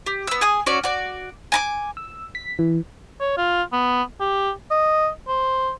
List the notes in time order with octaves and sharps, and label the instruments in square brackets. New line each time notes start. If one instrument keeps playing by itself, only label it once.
[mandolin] G4
B3 E6
G#4 G#5 D#6
C#4 F#4 C#5 D5
F#4 D5
G#5 A#5 D6
[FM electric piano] E6
B6
E3
[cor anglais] C#5
F4
B3
G4
D#5
C5